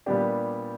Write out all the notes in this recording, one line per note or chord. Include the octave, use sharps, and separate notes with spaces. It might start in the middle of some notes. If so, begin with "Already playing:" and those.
A#2 G3 B3 D4 G4